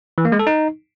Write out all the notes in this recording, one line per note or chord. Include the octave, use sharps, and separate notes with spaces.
E3
A#3
G#3
A4
D#4